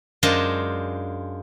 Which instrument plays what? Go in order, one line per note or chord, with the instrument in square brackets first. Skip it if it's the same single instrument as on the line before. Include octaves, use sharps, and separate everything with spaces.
[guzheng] F#2 G#3 D4 F4 C5